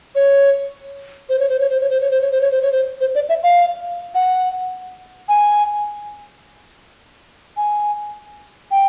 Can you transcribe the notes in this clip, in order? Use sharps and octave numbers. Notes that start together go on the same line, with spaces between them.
C#5
C5
C#5
C5
C#5
C5
C#5
C5
C#5
C5
C#5
C5
C#5
C5
C#5
C5
C5
D5
E5
F5
F#5
G#5
G#5
G5